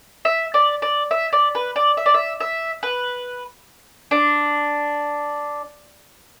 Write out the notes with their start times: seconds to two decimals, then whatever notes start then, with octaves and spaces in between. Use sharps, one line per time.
0.25 E5
0.54 D5
0.82 D5
1.11 E5
1.33 D5
1.55 B4
1.76 D5
1.97 E5
2.06 D5
2.14 E5
2.40 E5
2.83 B4
4.11 D4